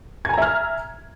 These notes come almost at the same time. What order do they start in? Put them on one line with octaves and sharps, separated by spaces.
G#6 G#5 A#5 E5 F6